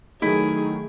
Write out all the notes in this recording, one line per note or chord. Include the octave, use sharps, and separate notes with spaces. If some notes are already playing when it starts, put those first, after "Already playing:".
D#3 F#3 A3 D#4 E4 G#4